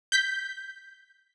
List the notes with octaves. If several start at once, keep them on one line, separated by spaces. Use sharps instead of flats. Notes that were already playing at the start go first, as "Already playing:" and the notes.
G6 B6